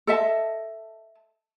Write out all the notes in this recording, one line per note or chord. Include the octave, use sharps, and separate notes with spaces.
A4 D#5 E5 A5